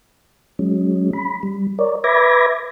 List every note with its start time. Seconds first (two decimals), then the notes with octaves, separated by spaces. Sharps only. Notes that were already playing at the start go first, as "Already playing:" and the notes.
0.59 F#3 G#3 C#4
1.13 B5
1.43 G3
1.79 A#4 C#5 D5
2.04 B4 E5 B5 D6 G#6 A#6